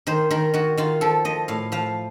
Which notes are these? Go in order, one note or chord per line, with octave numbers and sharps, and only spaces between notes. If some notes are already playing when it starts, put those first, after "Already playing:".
D#3 C5
D#3 A#4
D#3 F#4
D#3 F4
F3 A4
F3 D#5
A2 F5
F3 F5